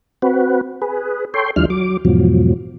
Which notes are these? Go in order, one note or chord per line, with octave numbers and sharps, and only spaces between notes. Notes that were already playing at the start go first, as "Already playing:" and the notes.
C4 F#4 B4
G#4 B4
A4 C#5 G5 C6
D#2 F3 G3 D4 E4 F6
F#3 D6
E2 G#2 B2 F3 F#3